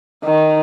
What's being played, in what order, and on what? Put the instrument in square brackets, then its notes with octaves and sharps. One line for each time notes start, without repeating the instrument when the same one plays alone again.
[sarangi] D#3